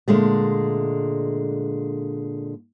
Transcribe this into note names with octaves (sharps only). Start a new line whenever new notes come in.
A#2 D3 G#3 A3